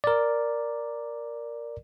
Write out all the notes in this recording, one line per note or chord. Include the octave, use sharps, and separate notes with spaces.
A#4 D5